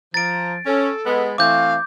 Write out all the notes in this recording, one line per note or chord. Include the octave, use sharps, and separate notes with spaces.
F3 A#5 A6 D7
C#4 A4
G#3 B3
E3 A3 C4 F5 D6 G6